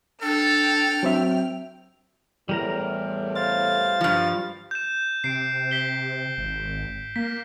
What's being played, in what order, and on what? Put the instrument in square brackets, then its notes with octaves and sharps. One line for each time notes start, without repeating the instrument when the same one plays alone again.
[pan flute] D4 [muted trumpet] A4 [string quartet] G5 F6
[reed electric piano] F#3 C4 E5
[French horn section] E2 A2 [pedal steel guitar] G3 A#4 A#5
[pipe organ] C5 F5 A6
[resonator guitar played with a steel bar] G2 F3
[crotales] G6 E7
[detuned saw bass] C3 [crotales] C7 D7
[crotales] B6 C7 G7
[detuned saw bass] G#1
[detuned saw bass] A#3 [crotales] B6